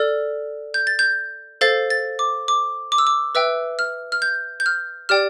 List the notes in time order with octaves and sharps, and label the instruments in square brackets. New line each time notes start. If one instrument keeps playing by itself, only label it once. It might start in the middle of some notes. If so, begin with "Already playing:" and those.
Already playing: [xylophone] A4 D5 F6
G6
A6
G6
A4 C5 F5 A6
A6
D6
D6
D6
E6
D6
B4 E5 G5 E6
F6
F6
G6
G6
F6
G4 D5 G5 F6